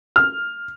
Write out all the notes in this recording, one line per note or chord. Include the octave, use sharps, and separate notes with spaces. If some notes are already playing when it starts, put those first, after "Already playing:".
F6